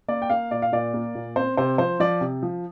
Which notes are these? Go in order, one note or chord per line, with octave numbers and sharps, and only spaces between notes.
A#3 D5
G5
A#3 F5
A#2 D5
F5
A#2 D5
A#3
A#2
C4 C5
C3 C5
F3 C5
F3 D5
C3
F3